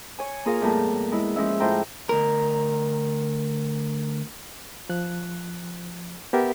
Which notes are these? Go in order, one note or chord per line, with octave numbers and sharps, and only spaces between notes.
C#5 G#5
A#3 F4 G#4 A#4 F5
E2 A2 G3 A#3 A#4 A5
G#3 E4
F3 G#3 C#4 E5
A2 A3 F4 C5 G5 A#5
D2 A#4
F3 F#6
B3 G4 A#4 E5